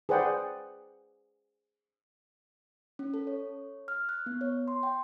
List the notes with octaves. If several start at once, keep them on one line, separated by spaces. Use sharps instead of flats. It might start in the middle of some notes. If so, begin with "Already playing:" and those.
G#4 B4 C5 D5 F#5 G5
C#4
A4
C#5
F6
F#6
B3
C#5
C6
G5